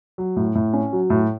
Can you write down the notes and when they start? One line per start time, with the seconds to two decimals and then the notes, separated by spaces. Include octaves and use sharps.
0.18 F#3
0.36 A2
0.55 A2
0.73 C#4
0.93 F#3
1.10 A2